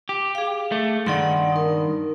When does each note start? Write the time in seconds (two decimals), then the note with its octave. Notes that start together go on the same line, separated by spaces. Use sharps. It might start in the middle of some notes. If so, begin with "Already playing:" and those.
0.09 G4
0.35 G#4 F5
0.72 A3
1.06 G2 D#3 D5 F#5 C6
1.52 D#4 A#4